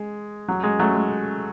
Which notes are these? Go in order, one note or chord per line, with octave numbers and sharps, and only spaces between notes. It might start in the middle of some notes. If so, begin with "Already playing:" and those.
Already playing: G#3
F#3
G#3
F#3 A3
G#3